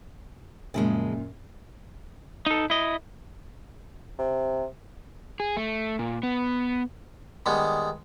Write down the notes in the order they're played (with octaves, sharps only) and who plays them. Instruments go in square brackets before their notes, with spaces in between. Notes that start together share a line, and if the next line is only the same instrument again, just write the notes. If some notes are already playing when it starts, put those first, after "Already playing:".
[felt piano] F#2 A#2 [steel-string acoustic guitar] C#3 F3 G#3
[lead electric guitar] D#4 A4
E4 D#5
[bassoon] C3
[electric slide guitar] G#4
A3
A#2
B3
[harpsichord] D#3 G3 G#3 B3